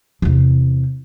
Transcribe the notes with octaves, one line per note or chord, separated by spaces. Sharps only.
E2 C3